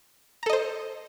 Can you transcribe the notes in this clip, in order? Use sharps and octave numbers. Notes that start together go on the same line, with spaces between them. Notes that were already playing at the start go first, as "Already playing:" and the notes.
A4 C5 D#5 A#5